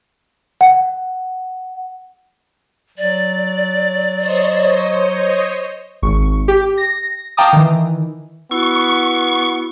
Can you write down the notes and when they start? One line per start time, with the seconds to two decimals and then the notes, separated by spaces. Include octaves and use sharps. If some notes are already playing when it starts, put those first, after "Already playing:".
0.61 F#5
2.98 F#3 D5
4.17 C5 C#5 D#5
6.02 G#1 C#6
6.48 G4
6.78 A#6
7.37 F5 G5 A5 A#5 D6 D#6
7.53 D#3 E3
8.51 B3 E4 F#4 C#6